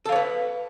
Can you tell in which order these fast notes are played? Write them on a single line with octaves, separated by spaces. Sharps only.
A4 F5 C#5 B4